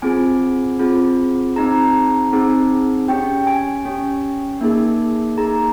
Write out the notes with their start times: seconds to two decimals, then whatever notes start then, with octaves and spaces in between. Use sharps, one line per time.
0.02 C4 F4 G#4 G#5
0.79 C4 F4 G#4
1.56 C4 D#4 G#4 A#5
2.32 C4 D#4 G#4
3.08 C#4 G4 G5
3.47 G#5
3.85 C#4 G4
4.61 A#3 D#4 G#4
5.37 A#3 D#4 G#4 A#5